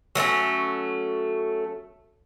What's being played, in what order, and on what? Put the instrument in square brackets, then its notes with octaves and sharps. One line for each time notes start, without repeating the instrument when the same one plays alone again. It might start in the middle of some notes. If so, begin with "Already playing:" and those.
[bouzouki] F#3 A3 B3 C#4